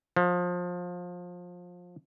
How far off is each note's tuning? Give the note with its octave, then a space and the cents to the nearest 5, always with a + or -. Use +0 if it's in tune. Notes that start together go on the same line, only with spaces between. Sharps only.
F3 +25